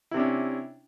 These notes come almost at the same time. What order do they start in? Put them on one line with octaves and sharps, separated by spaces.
E4 C3 D4 C#4